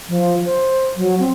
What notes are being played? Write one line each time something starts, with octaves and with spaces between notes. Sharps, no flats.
F3
C5
F#3
C4